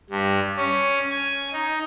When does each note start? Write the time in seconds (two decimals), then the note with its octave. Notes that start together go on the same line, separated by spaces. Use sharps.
0.10 G2
0.57 C#4
1.10 G#5
1.53 D#4